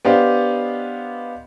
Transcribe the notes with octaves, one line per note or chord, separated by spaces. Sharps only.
B3 D4 G4 C5 D#5 F5